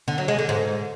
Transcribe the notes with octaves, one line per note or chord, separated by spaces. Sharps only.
D3
F#3
G#3
D3
G#2